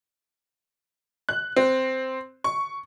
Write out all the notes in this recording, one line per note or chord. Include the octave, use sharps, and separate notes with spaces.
F#6
C4
C#6